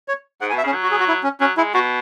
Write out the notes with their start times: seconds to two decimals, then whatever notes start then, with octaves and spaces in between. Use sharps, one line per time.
0.08 C#5
0.41 G#2 F#5
0.50 G#5
0.53 B2
0.58 E5
0.64 C#3 C#4
0.75 F#3
0.83 F#4
0.91 G#4
0.99 F#4
1.08 E4
1.24 C#4
1.41 F#3 C#4
1.57 G#3 E4
1.74 B2 F#4